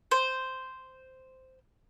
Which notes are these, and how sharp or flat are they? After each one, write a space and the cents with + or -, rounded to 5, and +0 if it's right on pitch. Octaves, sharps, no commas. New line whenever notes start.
C5 -5